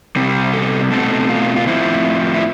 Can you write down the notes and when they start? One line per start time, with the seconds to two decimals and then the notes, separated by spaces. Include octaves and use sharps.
0.16 C3 G3 C4
0.54 A4
0.91 B2 A3 C4 A4
1.29 F4
1.56 F4
1.67 A2 F3 C4 E4
2.34 E4